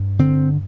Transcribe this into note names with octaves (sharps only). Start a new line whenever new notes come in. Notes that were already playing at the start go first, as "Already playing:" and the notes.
Already playing: G2
D3 C4